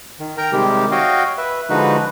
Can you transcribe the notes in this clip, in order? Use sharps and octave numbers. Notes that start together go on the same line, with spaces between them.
D#3
A#4 G5 A#5
C3 D#3 G3 G#3 G4
F#4 C#5 D#5 F5 G5
B4 E5
D3 F3 G#3 D#4 F#4 B4